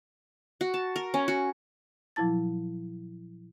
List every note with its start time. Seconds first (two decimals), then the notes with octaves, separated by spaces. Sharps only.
0.61 F#4
0.74 A5
0.96 A#4
1.14 C#4
1.28 F#4
2.16 A#2 F3 F#3 E4 A5 A6